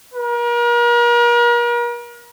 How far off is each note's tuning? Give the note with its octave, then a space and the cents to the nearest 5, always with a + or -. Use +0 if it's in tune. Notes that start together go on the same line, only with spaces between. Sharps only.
A#4 +40